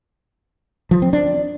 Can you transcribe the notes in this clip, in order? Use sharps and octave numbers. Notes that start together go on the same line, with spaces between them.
F3
C4
D4